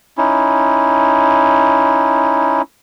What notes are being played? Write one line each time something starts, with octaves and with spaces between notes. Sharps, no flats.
C#4 D#4 E4